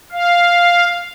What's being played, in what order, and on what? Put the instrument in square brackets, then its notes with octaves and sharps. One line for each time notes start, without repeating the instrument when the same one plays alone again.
[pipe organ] F5